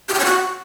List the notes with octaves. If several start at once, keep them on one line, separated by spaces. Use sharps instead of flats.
G4
G5
C#5
F#4